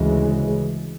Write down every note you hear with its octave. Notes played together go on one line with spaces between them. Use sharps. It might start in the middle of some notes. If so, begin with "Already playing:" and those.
Already playing: D2 C#3 E3 G#3